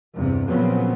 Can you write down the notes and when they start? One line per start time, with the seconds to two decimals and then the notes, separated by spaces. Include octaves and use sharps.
0.15 E2 G2 C3
0.48 A#2 C#3 F3 F#3 B3 C4